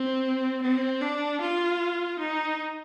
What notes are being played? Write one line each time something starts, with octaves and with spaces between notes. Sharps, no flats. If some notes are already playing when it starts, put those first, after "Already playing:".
Already playing: C4
C4
D4
F4
D#4